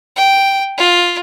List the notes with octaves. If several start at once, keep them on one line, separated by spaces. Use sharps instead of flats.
G5
F4